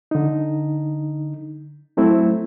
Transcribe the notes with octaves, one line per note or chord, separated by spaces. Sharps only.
D3 D#4
F#3 A3 C4 E4